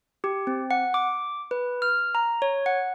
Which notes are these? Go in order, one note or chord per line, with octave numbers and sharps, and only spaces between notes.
G4
C4
F#5
D6
B4
F6
A#5
C#5
F#5